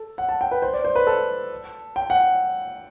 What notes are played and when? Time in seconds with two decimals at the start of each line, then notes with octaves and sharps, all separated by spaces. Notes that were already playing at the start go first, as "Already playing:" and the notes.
Already playing: A4
0.18 F#5
0.29 A5
0.41 G5
0.51 B4
0.62 C5
0.74 D5
0.85 C5
0.96 B4
1.07 A4
1.96 G5
2.10 F#5